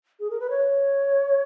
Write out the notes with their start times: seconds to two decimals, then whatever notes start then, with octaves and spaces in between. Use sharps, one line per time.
0.20 G#4
0.30 A#4
0.40 B4
0.50 C#5